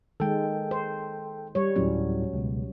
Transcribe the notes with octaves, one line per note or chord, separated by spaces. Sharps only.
D#3 G#3 A4 G5
C5
G3 C#5
D2 A2 F#3 G3 C#4
C#2 B2